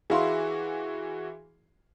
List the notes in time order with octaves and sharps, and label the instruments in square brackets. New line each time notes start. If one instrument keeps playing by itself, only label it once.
[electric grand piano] E3 F#4 [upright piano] E4 F5 C6 [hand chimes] G#4